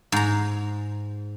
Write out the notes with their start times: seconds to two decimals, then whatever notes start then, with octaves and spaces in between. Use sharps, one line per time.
0.12 G#2 A#5